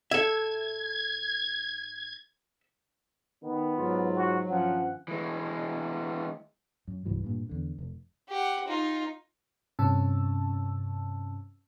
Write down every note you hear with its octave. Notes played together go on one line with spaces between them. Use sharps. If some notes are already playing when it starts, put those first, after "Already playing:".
A4 E5 G#6
D#3 B3
G#2 F#3 F4
F#4
G2 D#3 F3 C#4 F#5
E3 G#3
F#2
C2 G2 E3 F#3
G2 A#2
E2 D3
F1
G4 F#5
D#4 F4
G2 C3 C#4 A5 E6